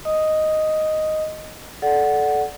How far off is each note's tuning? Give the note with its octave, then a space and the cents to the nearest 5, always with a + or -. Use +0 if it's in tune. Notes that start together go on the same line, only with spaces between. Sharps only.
D#5 +0 D#6 +0
A4 -20 D5 +0 F#5 +0